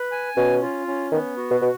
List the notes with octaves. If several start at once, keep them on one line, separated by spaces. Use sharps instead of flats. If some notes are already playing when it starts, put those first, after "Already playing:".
Already playing: B4
G#5
B2 C#4
F4
C#4
D#3 B3
F#4
B2
B2